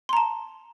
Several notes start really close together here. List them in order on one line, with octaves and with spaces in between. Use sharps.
C6 A#5 A5